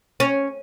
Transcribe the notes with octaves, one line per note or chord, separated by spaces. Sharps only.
C#4